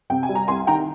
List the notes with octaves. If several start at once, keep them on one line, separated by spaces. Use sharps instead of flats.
C3 G5
G#5
G3
A#5
C2 G#5 C6
D#3 G5 A#5